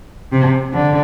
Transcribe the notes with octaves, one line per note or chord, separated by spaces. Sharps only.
C3
D3